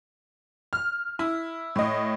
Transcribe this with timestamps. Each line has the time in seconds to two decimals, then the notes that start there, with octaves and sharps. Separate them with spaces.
0.73 F6
1.19 E4
1.76 A2 D#5